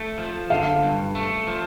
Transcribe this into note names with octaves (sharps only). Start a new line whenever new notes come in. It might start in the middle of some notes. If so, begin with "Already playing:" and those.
Already playing: A3
F3
D3 F5
G2
A3
F3